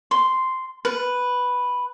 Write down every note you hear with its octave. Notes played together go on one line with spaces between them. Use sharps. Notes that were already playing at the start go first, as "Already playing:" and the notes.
C6
B4